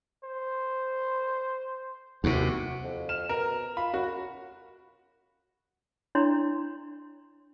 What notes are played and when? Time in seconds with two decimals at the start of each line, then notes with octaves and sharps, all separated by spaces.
0.24 C5
2.24 D#2 C3 F#4
2.84 F2
3.09 F6 E7
3.29 B2 A#4
3.77 F4 B5
3.94 F#2 F#4
6.15 D4 E4 C#5 A#5 C6